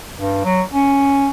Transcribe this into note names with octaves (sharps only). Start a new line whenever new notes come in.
G2
F#3
C#4